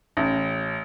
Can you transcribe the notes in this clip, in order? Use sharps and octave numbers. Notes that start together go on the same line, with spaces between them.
A1